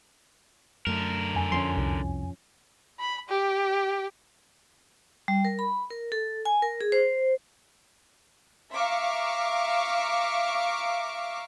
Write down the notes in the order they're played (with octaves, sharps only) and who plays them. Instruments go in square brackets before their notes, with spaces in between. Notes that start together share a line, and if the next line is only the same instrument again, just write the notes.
[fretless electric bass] F#2 A3 [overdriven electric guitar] D3 A#4 [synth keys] E7
[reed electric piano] F2 G#5
[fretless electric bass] F3 C4 C#4 [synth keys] C6
[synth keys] C2
[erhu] B5
G4
[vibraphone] G3
A#4
B5
A#4
A4
G#5
A#4
G#4
C5
[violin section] E5 F5 A#5 C#6 D6